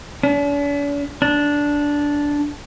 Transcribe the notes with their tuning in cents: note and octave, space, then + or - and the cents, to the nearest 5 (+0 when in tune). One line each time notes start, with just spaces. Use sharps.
D4 -45
D4 -10